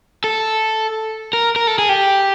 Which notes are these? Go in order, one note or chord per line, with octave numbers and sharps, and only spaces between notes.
A4
A#4
A#4
A4
G#4
G4